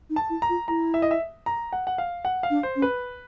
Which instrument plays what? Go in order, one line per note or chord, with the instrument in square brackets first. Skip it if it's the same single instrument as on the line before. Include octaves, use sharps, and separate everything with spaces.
[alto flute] D#4
[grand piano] A5
[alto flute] E4
[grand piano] A#5
[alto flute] F4
[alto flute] E4 [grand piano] A#5
[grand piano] E5
D#5
E5
A#5
F#5
F#5
F5
F#5
F5
[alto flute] D4
[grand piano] C5
[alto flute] C#4
[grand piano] B4